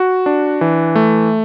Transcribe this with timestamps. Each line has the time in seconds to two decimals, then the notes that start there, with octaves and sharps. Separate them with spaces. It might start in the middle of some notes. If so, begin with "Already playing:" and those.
Already playing: F#4
0.26 D4
0.61 E3
0.95 A3